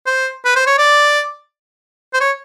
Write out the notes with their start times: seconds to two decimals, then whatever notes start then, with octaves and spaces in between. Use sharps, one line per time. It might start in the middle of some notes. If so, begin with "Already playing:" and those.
0.06 C5
0.45 B4
0.56 C5
0.67 C#5
0.78 D5
2.14 C5
2.20 C#5